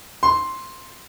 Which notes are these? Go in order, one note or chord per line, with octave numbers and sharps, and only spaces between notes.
C6